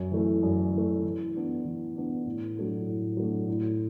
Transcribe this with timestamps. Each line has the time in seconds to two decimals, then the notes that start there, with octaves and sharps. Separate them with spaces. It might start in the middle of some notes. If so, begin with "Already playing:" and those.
Already playing: F#2
0.12 E3 A3
0.43 F#2
0.73 E3 A3
1.03 E3
1.35 B3 D4
1.65 E3
1.96 B3 D4
2.26 A2
2.56 F#3 A3 D4
2.87 A2
3.17 F#3 A3 D4
3.48 A2